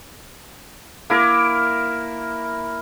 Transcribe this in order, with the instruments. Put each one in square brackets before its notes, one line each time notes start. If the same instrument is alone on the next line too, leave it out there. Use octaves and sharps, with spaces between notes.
[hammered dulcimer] A#3 E4 A#4